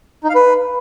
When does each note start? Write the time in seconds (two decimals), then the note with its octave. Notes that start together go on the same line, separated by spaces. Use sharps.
0.24 D#4
0.29 F5
0.35 B4